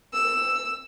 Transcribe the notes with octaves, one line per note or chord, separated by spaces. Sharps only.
E6